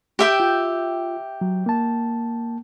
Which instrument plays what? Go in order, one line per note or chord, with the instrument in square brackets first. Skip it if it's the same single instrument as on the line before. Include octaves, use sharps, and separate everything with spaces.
[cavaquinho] G4 E5 G5
[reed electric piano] F4
F#3
A#3 A5